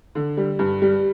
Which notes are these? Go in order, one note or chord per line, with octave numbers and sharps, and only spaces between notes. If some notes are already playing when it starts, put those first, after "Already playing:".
D3
G3
G2
G3